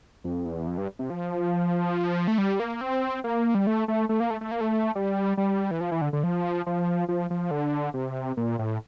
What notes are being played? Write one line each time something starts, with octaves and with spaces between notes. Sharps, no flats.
F2
E2
F2
G2
C3
F3
A3
G3
A#3
C4
A#3
G3
A3
A3
A3
A#3
A3
A3
A#3
A3
G3
G3
E3
F3
E3
D3
D3
F3
F3
F3
F3
D3
C3
A#2
A2